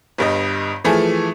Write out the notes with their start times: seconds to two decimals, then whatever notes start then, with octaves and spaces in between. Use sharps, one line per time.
0.18 G1 G2 D#5
0.84 E3 F3 A3 G#4